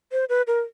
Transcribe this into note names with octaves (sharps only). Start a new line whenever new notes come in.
C5
B4
A#4